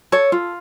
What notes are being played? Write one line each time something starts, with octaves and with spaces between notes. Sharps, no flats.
A4 C#5
F4